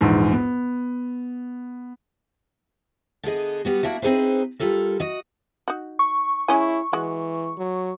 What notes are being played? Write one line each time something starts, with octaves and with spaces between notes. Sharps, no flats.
A#1 E2 G#2
B3
D3 B3 G#4 D#5
G3 B3 F#4
A#3 D4 E4 F#4
C4 D#4 G#4 B4 C5
G3 F4 A4 A#4
F#4 D#5
D#4 F#4
C#6
G#3 C#4 E4 G#5
E3 G#3 F#4
F#3